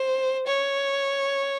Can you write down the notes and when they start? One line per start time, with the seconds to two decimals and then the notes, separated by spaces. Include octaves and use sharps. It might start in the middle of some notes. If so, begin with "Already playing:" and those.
Already playing: C5
0.47 C#5